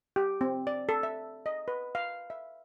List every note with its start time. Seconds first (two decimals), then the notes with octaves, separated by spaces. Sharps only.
0.16 G4
0.41 C4
0.67 D5
0.89 A4
1.03 E5
1.46 D#5
1.68 B4
1.95 F5
2.30 E5